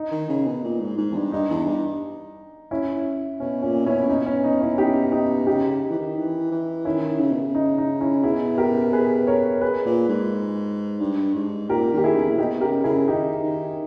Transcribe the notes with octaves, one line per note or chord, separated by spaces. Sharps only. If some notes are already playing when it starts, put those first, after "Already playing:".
Already playing: D#4
D#3
C#3
B2
A#2
G#2
G#2
E2
G2
G2 D#4
E2
G2
C#4 E4
B2 C#4
A#2 C#4
B2 C#4 E4
B2 D#4
C#4
D#4
C#4 E4
D#4 G4
D#4 G4
C#3 D#4 G4
C#3
E3
D#3
E3
E3
D#3 C#4 E4
C#3
B2
C#3
D#4
D#4
C#4 E4
B2 E4 G#4
G4 A#4
G#4 B4
A#4 C#5
G#4 B4
A#2
G#2
G2
G#2
A#2 G4 A#4
D#3 G4
E4 G#4
E2
A#2
B2 D#4 G4
C#3 G4 A#4
C#3 E4 G#4
D#3 D#4 G4
D#3